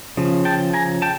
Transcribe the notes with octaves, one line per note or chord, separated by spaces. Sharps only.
C#3 F3
G5 A5
G#5 A#5
G5 A5